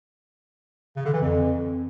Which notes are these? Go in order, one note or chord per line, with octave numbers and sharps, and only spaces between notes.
C#3
D3
E3
F2